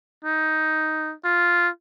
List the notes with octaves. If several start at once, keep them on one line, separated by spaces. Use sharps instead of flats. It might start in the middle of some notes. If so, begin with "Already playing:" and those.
D#4
F4